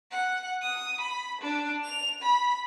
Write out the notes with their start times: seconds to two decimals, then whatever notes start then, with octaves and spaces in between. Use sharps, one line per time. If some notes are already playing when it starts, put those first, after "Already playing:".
0.11 F#5
0.61 D#6
1.01 B5
1.41 D4
1.84 F7
2.22 B5